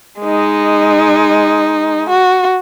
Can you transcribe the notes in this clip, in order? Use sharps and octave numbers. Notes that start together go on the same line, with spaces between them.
G#3 D#4
F#4